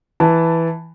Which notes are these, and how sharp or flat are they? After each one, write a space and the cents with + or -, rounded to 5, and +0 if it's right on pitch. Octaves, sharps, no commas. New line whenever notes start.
E3 +0 A5 +5